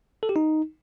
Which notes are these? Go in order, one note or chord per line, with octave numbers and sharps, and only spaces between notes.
A4
G4
D#4